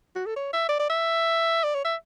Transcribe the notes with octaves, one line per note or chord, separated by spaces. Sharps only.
F#4
A4
C#5
E5
D5
D5
E5
D5
C#5
E5